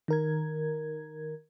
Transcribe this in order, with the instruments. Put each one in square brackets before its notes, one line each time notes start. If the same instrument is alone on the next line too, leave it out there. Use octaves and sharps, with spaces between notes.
[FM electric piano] D#3 A#4 G#6